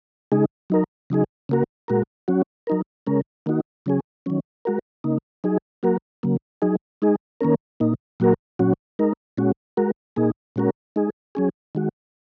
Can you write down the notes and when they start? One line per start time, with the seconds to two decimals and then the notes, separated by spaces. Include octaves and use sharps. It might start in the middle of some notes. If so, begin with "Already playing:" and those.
0.32 C#3 G#3 D#4 G#4
0.70 F#3 D#4 A#4
1.10 C#3 F#3 D#4 G#4
1.49 C#3 A#3 F#4 A#4
1.88 A#2 G#3 F#4 A#4
2.28 F#3 C#4 F#4
2.67 F#3 D#4 A#4
3.07 C#3 G#3 C#4 A#4
3.46 D#3 A#3 D#4 F#4
3.86 C#3 F#3 C#4 G#4
4.26 D#3 F#3 C#4
4.65 G#3 F#4 A#4
5.04 C#3 A#3 D#4
5.44 F#3 D#4 G#4
5.83 F#3 A#3 F#4 A#4
6.23 C#3 F#3 A#3
6.62 F#3 D#4 G#4
7.02 G#3 D#4 G#4
7.41 D#3 A#3 C#4 A#4
7.80 A#2 A#3 D#4
8.20 A#2 F#3 A#3 F#4 A#4
8.59 A#2 F#3 C#4 F#4
8.99 G#3 D#4 A#4
9.37 A#2 G#3 C#4 F#4
9.77 G#3 F#4 A#4
10.16 A#2 A#3 D#4 G#4
10.56 A#2 G#3 C#4 F#4 A#4
10.96 G#3 D#4 G#4
11.35 F#3 C#4 G#4
11.75 D#3 G#3 F#4